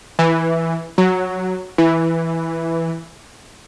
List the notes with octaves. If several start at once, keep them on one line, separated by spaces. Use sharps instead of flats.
E3
F#3
E3